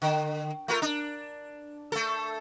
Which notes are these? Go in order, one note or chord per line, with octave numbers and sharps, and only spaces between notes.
D3
A3 F4 A#4
D4
A3 A4